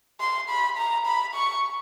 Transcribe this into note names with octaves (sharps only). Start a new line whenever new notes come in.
C6
B5
A#5
B5
C#6